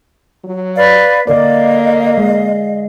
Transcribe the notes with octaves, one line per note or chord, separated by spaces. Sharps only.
F#3
B4 D5 F5
D3 A#3 A#4 D5 D#5 F5
G#3